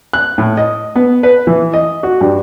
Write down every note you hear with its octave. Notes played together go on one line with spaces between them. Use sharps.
F#6
A2
D#5
B3
B4
E3
D#5
F#4
G2